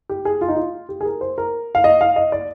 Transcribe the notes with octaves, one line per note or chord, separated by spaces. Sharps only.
G4
G#4
F4
D#4
F4
G4
G#4
A#4
C5
A#4
F5
D#5
F5
D#5
D5